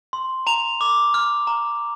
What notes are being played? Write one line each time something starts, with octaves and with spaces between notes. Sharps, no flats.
C6
A#5 F7
D6
F6
A#5